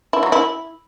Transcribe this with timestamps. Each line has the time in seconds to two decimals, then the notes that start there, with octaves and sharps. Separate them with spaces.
0.13 E4
0.23 F#3
0.32 E4